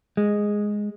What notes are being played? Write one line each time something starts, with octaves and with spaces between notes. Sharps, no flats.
G#3